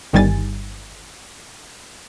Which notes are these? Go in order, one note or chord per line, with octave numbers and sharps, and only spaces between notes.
G1 D#3 G3 G#5 A6